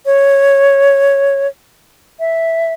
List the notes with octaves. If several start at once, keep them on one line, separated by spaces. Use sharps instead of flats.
C#5
E5